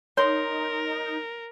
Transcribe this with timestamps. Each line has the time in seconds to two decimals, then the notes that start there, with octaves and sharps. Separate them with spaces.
0.17 D#4 A#4 C#5 C6